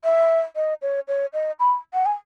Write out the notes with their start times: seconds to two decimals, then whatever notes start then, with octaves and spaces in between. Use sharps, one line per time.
0.04 E5
0.56 D#5
0.82 C#5
1.08 C#5
1.33 D#5
1.60 B5
1.94 F#5
2.06 G#5